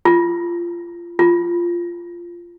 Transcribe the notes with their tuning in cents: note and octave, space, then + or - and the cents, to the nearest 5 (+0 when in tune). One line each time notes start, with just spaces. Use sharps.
F4 -25
F4 -15